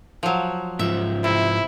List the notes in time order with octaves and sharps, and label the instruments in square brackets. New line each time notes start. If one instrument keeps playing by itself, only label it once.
[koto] F3 F#3
[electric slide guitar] G#2 F3 [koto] E5
[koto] C3 [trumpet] E4